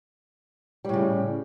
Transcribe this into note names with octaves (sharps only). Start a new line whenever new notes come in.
A2 C#3 G3